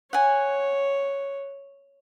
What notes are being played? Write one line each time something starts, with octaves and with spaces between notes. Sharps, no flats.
C#5 F#5 G#5